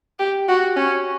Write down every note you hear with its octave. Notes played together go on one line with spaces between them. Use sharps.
G4
F#4
C#4